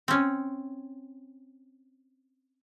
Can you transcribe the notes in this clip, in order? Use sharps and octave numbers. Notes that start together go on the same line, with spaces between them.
C4 C#4